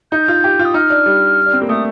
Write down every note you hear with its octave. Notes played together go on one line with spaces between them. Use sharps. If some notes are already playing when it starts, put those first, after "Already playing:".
D#4 G6
F4
G4
F4
D#6
D#4 F6
D4
G3
D4
C4
A#3
A3 D#6